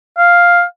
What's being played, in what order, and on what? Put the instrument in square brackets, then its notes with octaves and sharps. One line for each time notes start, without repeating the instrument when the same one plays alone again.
[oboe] F5